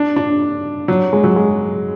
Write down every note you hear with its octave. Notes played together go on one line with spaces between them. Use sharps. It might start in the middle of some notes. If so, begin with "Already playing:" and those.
Already playing: D4
D4
F#3
G#3
F#3
G#3